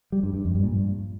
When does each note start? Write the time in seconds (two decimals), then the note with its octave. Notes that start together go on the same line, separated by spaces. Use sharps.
0.12 G3
0.23 G2
0.34 G2
0.45 F2
0.55 G2
0.64 A#2
0.73 G2